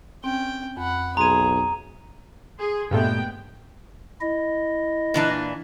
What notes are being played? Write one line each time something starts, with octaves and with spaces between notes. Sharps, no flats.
C4 C#4 G5
F2 F#5 B5
B1 G#4 A#5 C6 G#6 D#7
G#4 C6
G2 A#2 G#3 A3 B3 G5
E4 D#5
A#2 E3 D4